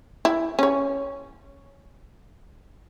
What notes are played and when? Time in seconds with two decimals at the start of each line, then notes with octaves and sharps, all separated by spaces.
0.25 E4
0.59 C#4 C#5